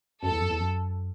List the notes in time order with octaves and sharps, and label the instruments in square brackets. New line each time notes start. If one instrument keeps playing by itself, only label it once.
[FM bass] F#2 [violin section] A4
[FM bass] E2
F#2
E2
F#2